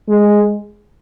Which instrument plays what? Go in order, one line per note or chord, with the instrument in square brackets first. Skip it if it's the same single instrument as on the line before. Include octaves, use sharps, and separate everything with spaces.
[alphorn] G#3